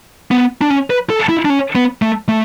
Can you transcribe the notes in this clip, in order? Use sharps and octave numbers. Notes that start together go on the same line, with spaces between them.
B3
D4
C#4
B4
A4
E4
D4
C#4
B3
A3
A3